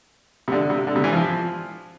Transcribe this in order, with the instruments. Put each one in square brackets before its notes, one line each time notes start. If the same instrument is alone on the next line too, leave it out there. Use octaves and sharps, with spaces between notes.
[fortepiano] C3
D3
C3
D3
C3
E3
F3